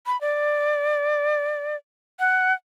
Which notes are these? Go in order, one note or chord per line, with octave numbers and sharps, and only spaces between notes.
B5
D5
F#5